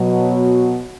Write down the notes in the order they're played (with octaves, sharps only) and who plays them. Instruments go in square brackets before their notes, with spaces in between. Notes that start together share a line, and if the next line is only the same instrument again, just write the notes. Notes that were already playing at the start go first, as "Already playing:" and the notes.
Already playing: [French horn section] B2 F#3